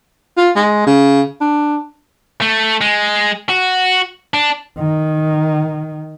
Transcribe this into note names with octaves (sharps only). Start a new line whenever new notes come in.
F4
G#3
C#3
D4
A3
G#3
F#4
D4
D#3